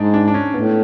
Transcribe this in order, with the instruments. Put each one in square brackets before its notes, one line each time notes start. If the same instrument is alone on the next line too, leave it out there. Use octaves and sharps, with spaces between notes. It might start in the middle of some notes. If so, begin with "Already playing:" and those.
Already playing: [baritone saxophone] G#2 [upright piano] D4 D#4
[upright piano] D4
D4
C#4
[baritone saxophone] A2 [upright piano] B3